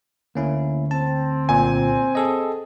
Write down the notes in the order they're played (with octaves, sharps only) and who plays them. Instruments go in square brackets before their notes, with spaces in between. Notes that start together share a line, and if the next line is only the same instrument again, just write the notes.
[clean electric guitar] D2 [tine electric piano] A#3 C#4 E4
[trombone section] C4 [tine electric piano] A5
[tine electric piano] C2 A#2 [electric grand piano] G#5
[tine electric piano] G#4 A4 D#5